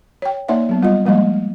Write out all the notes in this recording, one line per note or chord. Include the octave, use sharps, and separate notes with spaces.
C#5 G5
A#3 D#4 C#5 D5 E5 F#5
F#3 B3
G3 F4 D#5
F3 G3 G#3 A#3 D#5